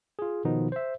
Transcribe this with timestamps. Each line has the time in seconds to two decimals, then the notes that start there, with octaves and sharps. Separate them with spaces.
0.19 F4 G#4
0.45 B2 D#3 F3 B3 D#4
0.72 C5 E5